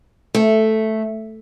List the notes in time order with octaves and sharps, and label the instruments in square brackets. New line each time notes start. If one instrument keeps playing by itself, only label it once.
[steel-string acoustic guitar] A3